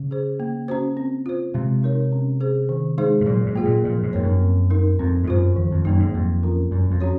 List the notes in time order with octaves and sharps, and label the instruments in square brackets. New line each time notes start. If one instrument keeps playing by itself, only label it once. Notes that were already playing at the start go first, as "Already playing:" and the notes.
Already playing: [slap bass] C#3
[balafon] G#4 C5
A#3
C#4 F#4 C5
C4
F4 C5
[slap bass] C3 [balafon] G#3
[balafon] D#4 A#4 C#5
C#4
G#4 C5
D#3
G#3 D#4 G#4 C5
[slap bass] G#2
[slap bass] A#2 [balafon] F#3
[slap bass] G#2
[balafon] A#3 F4 G#4
[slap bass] A#2
[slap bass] A#2 [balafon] F3
[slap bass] G#2
[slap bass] F2 [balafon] A#3 D#4 A#4 C#5
[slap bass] F#2
[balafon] C4
D#4 A#4
[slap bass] F2 [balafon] C4
[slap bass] G#2
[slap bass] F#2 [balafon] F4 C5
[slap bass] F2 [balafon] D#3
[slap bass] F2
[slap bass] F#2 [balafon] F#3 A#3 D#4
[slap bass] G#2
[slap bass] F2 [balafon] A#3
[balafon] C#4 F4 A#4
[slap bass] F#2 [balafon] F#3
[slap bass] F2
[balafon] C#4 F#4 C#5